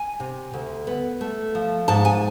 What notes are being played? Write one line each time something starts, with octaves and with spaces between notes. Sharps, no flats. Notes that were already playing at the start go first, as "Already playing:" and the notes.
Already playing: G#5
C3
D2
B3
A3
F3
G#2 A5
G#5